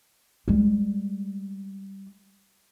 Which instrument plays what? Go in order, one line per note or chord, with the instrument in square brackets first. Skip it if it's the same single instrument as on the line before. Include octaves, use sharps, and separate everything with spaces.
[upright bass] G3 G#3